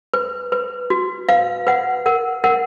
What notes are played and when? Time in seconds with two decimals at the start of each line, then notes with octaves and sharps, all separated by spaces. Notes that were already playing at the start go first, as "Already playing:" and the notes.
0.14 B4
0.52 B4
0.90 F#4
1.29 B4 F5
1.67 B4 F#5
2.06 A#4 F#5
2.44 A#4 F#5